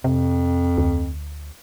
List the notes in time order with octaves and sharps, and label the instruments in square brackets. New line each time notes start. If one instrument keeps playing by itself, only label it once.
[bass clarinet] F2 [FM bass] C3
[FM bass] D2